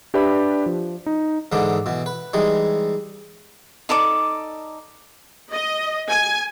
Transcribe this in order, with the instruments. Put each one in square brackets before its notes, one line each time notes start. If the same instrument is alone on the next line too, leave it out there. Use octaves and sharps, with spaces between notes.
[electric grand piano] D4 G4 B4 D5 E5 B5
F3
D#4
[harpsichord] G#2 D3 E3 D4 D#4
B2 E3
B4
E3 G3 G#3 D#4
[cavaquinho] D#4 A4 D5 D6
[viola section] D#5
G#5